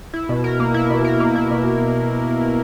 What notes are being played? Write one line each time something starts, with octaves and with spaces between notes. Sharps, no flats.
E4
B2
A#4
A#3
E4
B2
A#4
A#3
E4
B2